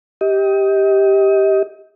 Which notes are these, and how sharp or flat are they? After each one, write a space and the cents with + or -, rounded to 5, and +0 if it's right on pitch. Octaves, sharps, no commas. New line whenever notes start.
G4 +0 D#5 +30